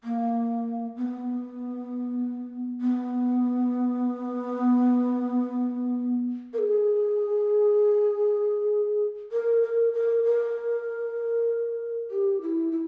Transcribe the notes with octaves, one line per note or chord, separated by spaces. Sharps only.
A#3
B3
B3
A#4
G#4
A#4
A#4
A#4
A#4
G4
E4
E4